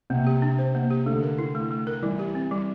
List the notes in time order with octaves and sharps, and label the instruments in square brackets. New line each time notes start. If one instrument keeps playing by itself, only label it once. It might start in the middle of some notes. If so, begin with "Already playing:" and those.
[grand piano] C3 [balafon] A#3
[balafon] G4
D4
C5
A#3
G4
[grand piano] D3 [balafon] A3
[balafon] A#4
E4
A3
A3
A#4
[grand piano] E3 [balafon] G3
[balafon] G4
C4
G3